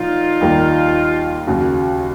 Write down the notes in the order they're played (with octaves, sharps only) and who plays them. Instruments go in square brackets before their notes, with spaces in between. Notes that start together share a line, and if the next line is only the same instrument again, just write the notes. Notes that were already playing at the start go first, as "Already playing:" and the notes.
Already playing: [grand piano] A#2 F3 [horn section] D#4 F4
[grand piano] D#2 D#3 G3 A#3
D#2 C#3 F#3